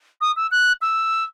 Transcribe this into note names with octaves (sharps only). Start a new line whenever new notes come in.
D#6
E6
F#6
E6